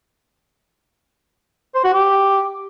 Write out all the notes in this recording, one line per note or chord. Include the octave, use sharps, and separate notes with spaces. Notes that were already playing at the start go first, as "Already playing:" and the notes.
C5
F#4
G4